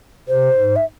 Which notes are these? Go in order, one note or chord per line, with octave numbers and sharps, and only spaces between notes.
C3 C5
G#2
E5